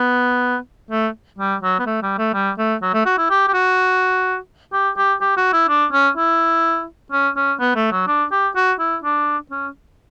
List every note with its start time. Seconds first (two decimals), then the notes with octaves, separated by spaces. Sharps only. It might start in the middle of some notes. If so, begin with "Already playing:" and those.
Already playing: B3
0.91 A3
1.39 G3
1.62 F#3
1.79 B3
1.86 A3
2.02 G3
2.18 A3
2.34 G3
2.58 A3
2.82 F#3
2.94 A3
3.06 F#4
3.18 E4
3.30 G4
3.48 G4
3.53 F#4
4.73 G4
4.97 G4
5.21 G4
5.37 F#4
5.53 E4
5.69 D4
5.92 C#4
6.17 E4
7.12 C#4
7.36 C#4
7.60 B3
7.76 A3
7.91 F#3
8.07 D4
8.31 G4
8.56 F#4
8.79 E4
9.04 D4
9.51 C#4